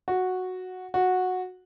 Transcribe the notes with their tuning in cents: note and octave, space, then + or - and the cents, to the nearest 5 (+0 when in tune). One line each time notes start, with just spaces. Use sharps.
F#4 -5
F#4 -10